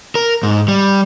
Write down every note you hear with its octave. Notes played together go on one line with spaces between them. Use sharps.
A#4
G#2
G3